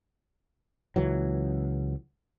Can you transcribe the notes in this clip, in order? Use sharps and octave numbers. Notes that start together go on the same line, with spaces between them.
C#2 E3 F#3